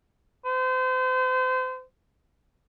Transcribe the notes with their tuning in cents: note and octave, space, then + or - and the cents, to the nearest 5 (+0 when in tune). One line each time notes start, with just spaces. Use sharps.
C5 -35